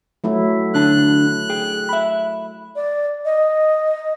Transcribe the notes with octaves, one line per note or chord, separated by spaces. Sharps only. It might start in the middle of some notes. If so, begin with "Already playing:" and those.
F#3 A3 E4
D3 D4 A5 F#6
G#4 G5
E5 B5
D5
D#5